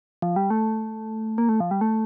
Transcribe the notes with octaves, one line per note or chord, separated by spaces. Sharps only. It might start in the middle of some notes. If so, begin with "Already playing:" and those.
F3
G3
A3
A#3
A3
F3
G3
A3